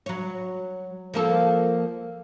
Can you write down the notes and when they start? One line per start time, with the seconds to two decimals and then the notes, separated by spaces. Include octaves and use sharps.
0.06 F#3 C#5
1.14 F3 A#3 A4